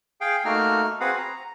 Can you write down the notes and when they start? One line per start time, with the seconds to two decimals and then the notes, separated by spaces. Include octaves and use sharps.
0.21 G#4 F5 G5
0.45 A3 A#3 D#4 F#4 F6
1.00 C4 F#4 G#4 B4 F5 F#5
1.18 A#5